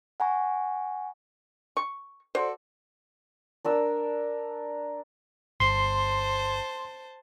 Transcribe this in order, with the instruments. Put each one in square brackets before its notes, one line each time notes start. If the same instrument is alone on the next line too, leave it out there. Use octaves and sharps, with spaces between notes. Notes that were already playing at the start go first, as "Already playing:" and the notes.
[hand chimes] F#5 G#5 A#5 C#6
[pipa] C#6
[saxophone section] F#4 A4 D5 [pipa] C5
[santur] D4 A#4 E6
[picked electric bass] G1 [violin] C5 A5 [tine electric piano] C6